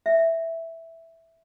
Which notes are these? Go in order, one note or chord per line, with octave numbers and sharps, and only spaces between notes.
E5